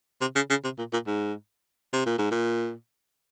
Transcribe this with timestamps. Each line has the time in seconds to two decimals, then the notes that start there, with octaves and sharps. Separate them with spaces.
0.21 C3
0.35 C#3
0.50 C#3
0.64 C3
0.78 A#2
0.93 A#2
1.07 G#2
1.93 C3
2.06 A#2
2.18 G#2
2.31 A#2